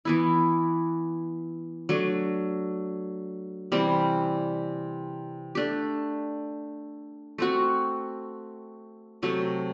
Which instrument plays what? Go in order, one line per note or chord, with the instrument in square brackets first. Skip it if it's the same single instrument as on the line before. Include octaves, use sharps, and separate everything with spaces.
[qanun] E3 B3 E4
F#3 A3 D4
C3 E3 G3 C4
A3 D4 G4
A3 C4 F#4
C3 F#3 A3